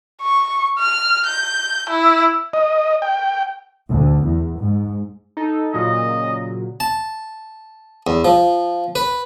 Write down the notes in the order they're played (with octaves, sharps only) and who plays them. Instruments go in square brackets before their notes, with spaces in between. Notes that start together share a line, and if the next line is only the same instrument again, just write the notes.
[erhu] C#6
F6
G6
E4
[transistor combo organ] D#5
G5
[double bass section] D2
E2
G#2
[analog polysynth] D#4 A4
[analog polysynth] A#2 C#3 F#3 [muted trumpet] D#5
[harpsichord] A5
E2
F3
B4